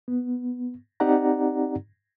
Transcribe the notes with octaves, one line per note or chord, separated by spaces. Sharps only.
B3
C4 D#4 G4 D5 F#5 A#5